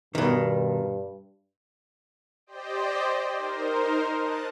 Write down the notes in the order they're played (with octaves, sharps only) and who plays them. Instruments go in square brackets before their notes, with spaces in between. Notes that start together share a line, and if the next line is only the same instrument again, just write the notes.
[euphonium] G2 [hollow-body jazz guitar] B2 D#3
[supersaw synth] G4 C5 D5 D#5 G5
D#4 A#4 C5
A5 D#6 F#6 A6